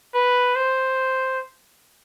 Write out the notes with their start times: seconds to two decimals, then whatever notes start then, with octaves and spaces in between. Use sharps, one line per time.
0.15 B4
0.56 C5